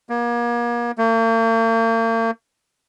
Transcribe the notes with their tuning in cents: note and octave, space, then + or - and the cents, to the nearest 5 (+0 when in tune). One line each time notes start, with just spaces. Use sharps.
A#3 +35
A#3 -45